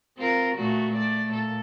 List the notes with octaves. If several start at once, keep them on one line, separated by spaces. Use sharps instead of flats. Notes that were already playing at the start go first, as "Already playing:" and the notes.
C4 F4 A#4
A#2 A3 F#4
A3 D5
A#2 A4